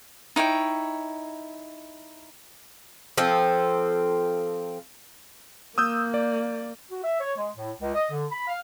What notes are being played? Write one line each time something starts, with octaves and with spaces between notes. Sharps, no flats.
D#4 E4 C#5 G5
F3 C4 A4
A#3 D#6 E6 G6
D5
F#4
E5
C#5
G#3
A2
C#2
D#5
D3
B5
F5